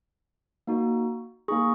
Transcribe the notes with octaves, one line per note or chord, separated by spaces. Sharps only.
A#3 D#4 F#4
A#3 D#4 G#4 C#6